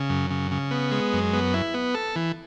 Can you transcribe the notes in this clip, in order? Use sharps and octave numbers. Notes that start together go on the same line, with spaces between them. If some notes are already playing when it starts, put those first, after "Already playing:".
Already playing: C#3
F#2
C#3
C#3
B3
G#3
F#2
B3
E4
B3
A4
E3